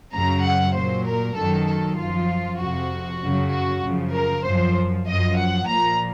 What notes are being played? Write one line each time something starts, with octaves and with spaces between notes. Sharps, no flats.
F#2 C#3 F#3 A#5
F#5
A#2 F#3 C5
A#4
F#2 D#3 F#3 A4
A4
F#2 F3 F4
F2 C3 F3 F#4
F#2 C#3 F#3
F#4
F#2 C#3 F3
A#4
F#2 F3 C5
F#2 F3 D#5
F#5
A#2 F3 A#5